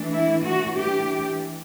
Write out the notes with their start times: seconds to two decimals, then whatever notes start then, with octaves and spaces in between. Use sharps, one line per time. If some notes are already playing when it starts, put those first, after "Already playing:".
Already playing: E3 A3 D4
0.11 E4
0.43 F#4
0.76 G4